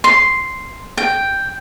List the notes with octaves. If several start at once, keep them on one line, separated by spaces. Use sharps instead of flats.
C6
G5